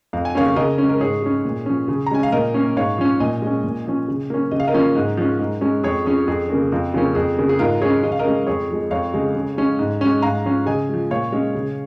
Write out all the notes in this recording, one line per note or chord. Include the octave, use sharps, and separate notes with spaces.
F2 F5
G#5
C#3 A#3 C#4 C#5 F5
C#3 A#4 D#5
C#4
G#3
A#4
G#2 G#4 C#5
G#3 C#4
A#2
F3 C#4
C#3
A#5
G#3 C#4 G#5
F5
A#2 A#4 D#5
A#3 C#4
G#2 C#5 F5
F3 C#4
A#2 D#5 G#5
G#3 C#4
A#2
F3 C#4
C#3
A#3 C#4
C#3 D#5
F5
A#4 D#5
F3 A#3 C#4
G#2
F3 G#3 C#4
G#2
G#3 C#4
F2 G#4 C#5
F3 C#4 G#4
F2 G#4
C#3 A#3 C#4
F2 F4
C#3 F3 A#3 C#4 F4
F2 G#4
C#3 A#3
G#4
G#2 F4 A#4
G#3 C#4 G#4 C#5
C#3 D#5
F5
A#4 D#5
G#3 C#4
F2 G#4 C#5
F3 G#3
F2 C#5 F5
C#3 G#3
C#3
G#3 C#4
G#2
G#3 C#4
G#2 F5 A#5
F3 C#4
C#3 D#5 G#5
F3 G#3
A#2 C#5 F5
G#3 C#4
C#3